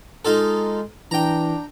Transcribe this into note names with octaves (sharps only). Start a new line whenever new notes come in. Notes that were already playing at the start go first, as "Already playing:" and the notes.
G#3 D#4 F4 A4
E3 D4 G5 A#5